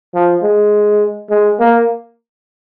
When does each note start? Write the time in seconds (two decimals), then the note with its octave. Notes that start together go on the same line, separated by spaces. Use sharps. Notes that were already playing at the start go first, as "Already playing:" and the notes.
0.15 F3
0.43 G#3
1.30 G#3
1.59 A#3